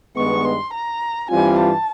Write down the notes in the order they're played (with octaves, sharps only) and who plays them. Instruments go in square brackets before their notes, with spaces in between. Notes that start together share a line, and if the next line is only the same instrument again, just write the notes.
[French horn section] G2 D#3 G#3 B3 [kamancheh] C#6
[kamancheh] C6
A#5
[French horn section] G2 E3 G3 C4 F4 [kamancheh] G#5
[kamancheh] A5